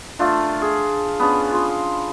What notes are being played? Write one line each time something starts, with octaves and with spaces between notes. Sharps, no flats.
A3 D4 F4
G#4
B3 C#4 D4 G#4
F4 C6